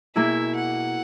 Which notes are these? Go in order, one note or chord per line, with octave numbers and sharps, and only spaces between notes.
B2 A#3 E4 G#4 E5
F#5